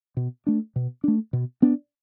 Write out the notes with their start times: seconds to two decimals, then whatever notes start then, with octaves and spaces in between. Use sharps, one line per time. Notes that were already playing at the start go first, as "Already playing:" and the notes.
0.17 B2
0.47 A3 D4
0.76 B2
1.04 A3 D4
1.33 B2
1.62 B3 D4